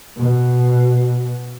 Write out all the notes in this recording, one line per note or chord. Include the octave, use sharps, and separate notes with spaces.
B2